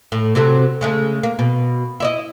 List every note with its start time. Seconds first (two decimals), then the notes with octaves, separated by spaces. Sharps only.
0.12 A2
0.35 C3 F#3 A3
0.81 C#3 G#3 A3
1.23 A#3
1.39 B2
2.00 E4 D5 D#5